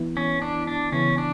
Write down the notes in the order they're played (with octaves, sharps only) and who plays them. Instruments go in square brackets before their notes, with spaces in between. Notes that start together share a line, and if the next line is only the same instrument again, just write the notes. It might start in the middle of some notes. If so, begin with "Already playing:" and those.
Already playing: [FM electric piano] E3 B3 E4
[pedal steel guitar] C#4
D4
D4
[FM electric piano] C#3 E3 B3 E4 [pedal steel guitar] C#4
[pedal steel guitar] D4